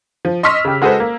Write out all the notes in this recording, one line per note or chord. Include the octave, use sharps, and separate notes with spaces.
F3
D#5 C6 C#6 E6 F6 B6
C#3 G4
G#3 F#4 G#4 A4 B4 C5
A#3